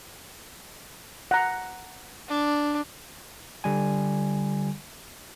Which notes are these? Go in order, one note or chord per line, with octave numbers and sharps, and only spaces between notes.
F#5 A#5
D4
D3 G3 G#5